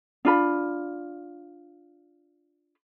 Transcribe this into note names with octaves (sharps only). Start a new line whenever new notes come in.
D4 F4 B5